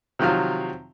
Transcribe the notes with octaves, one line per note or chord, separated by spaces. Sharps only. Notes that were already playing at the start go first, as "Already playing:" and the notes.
C3 D#3 F3 F#3 F4 F5